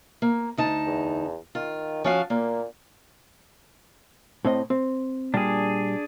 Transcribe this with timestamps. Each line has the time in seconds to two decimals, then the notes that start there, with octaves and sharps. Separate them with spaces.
0.22 A#3
0.57 D2 D#4 A5
0.86 E2
1.55 D#3 F4
2.04 F3 C#4 F#4 F5
2.30 A#2 A#3
4.45 A2 C4 D#5
4.70 C4
5.34 A#2 G3 D4 G#4